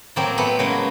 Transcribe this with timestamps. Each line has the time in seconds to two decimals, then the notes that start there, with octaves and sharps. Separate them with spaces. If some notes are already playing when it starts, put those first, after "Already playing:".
0.16 A2 F#3 A#3 C4
0.38 A3 B3
0.59 C#3 F#3 G#3 A#3